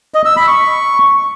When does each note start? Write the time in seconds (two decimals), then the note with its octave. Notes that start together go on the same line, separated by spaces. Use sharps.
0.14 D#5
0.25 E6
0.36 B5
0.47 C#6